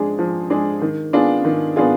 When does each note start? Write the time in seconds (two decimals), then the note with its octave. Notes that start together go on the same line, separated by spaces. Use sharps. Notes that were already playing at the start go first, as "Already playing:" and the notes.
Already playing: F3 G#3 D4 G#4
0.19 F3
0.50 G#3 D4 G#4
0.82 D#3
1.13 B3 D4 F4 G#4
1.45 D#3
1.76 B3 D4 F4 G#4